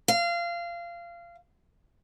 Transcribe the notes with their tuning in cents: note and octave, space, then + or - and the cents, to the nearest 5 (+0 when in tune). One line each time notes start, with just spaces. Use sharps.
F5 -20